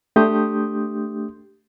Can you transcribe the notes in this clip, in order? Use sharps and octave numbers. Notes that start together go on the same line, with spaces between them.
A3 D4 G4 C6 D#6 G6